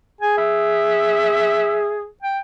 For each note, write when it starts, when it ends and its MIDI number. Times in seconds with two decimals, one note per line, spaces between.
0.21 2.08 68
0.21 0.34 80
0.37 1.97 76
2.22 2.39 79